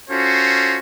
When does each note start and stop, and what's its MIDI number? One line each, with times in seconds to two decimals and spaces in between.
0.10 0.79 61
0.10 0.79 65
0.10 0.79 66
0.10 0.79 69
0.10 0.79 72